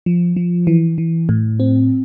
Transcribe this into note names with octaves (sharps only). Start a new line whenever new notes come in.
F3
F3
E3
E3
A2
C4